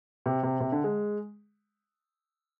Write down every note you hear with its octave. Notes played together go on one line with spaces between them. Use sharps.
C3
C3
C3
D3
G#3